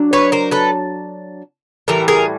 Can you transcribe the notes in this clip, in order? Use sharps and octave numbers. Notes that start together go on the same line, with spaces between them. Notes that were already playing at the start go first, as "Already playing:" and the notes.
Already playing: F#3 D4
B4 C#5
A#4 C5
A4 B4
A2 E3 G3 A#4
G#4 A#4